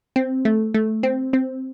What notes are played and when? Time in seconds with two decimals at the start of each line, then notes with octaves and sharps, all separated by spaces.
0.16 C4
0.45 A3
0.74 A3
1.03 C4
1.33 C4